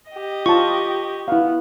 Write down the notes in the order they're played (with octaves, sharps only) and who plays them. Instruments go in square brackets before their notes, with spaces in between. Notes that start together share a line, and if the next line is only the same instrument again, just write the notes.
[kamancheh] G4 D#5
[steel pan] F4 A5 [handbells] C#6
[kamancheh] B3 [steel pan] E4 F5